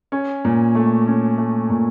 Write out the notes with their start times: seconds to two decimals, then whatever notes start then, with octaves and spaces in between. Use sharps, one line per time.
0.12 C#4
0.45 A#2
0.75 A3
1.07 C#4
1.38 A3
1.70 A#2